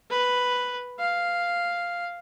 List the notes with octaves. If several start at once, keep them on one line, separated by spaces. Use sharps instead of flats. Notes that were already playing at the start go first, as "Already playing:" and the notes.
B4
F5